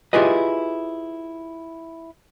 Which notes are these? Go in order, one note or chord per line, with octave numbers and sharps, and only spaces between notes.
E4 F4 G4 G#4 B4 D#5